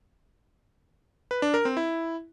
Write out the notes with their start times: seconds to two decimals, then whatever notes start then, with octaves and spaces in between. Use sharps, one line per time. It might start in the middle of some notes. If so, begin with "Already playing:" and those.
1.31 B4
1.42 D4
1.54 A#4
1.65 C4
1.77 E4